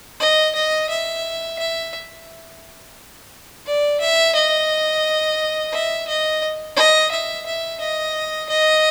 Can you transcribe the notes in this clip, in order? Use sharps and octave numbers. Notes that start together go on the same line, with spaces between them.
D#5
D#5
E5
E5
D5
E5
D#5
E5
D#5
D#5
E5
E5
D#5
D#5